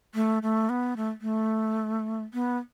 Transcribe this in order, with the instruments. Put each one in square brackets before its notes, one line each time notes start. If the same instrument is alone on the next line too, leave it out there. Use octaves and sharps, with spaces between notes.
[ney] A3
A3
B3
A3
A3
B3